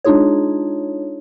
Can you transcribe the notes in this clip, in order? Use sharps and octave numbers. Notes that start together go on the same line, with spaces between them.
G#3 D4 D#4 F4 G#4 C#5